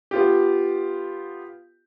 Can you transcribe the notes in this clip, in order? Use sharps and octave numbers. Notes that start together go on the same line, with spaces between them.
B3 F4 G4